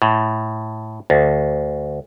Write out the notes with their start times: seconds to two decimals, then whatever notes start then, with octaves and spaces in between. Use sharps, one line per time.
0.02 A2
1.10 D2